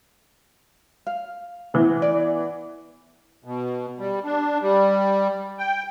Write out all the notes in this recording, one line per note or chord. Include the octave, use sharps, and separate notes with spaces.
F5
E3 B3
D5
B2
G3
D4
G3
G5